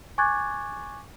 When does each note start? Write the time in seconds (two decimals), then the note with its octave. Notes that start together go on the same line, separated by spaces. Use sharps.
0.18 G#5 C#6 D6 F#6 G#6 A6